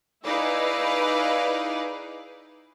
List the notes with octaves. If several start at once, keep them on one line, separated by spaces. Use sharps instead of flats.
D#4 E4 G#4 B4 D5 F5